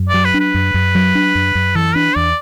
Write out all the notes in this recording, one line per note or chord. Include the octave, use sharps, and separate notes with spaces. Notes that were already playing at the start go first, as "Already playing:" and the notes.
Already playing: F#2
D5
F#3
B4
D4
B4
F#2
F#2
F#3
D4
F#2
F#2
E3 A4
D4 B4
E2 D5